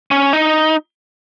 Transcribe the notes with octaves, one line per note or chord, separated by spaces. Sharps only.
C#4
D#4